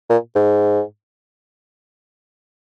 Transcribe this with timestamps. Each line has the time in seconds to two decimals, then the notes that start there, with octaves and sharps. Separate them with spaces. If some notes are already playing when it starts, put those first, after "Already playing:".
0.10 A#2
0.35 G#2